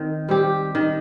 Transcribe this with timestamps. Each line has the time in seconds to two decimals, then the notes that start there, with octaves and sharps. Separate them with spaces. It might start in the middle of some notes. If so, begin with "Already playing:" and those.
Already playing: D#3 C4
0.29 G3 C4 G4
0.75 D#3